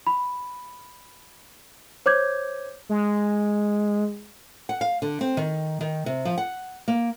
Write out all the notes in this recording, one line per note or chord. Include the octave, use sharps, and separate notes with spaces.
B5
C5 C#5 D6 G6 G#6
G#3
F#5
F5
D3
C4
D#3
D#3
C3
F3
F#5
A#3